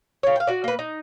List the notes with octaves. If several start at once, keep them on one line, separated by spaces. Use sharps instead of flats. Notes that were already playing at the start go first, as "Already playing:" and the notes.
F4 C#5
F5 G5
F#4 D5
A#3 B4
D#4